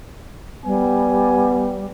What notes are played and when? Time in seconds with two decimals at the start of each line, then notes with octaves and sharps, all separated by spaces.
0.66 G3 B3 G#5